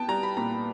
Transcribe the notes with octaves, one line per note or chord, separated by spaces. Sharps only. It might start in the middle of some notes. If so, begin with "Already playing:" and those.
Already playing: B3 G5 A5
G3 A#5
B5
A#2 A#5